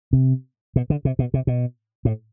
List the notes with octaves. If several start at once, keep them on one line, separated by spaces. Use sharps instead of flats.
C3
B2
D3
C3
B2
C3
B2
A2